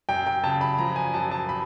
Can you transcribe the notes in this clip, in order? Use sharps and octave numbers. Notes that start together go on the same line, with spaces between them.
F#2 G5
G5
C#3 A5
B5
F3 A#5
G#5
F#2 A5
A5
B5